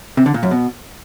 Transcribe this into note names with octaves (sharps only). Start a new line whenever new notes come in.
C3
D3
A#2
F#2
B2